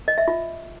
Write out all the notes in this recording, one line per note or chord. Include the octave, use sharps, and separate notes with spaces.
D#5
E5
F4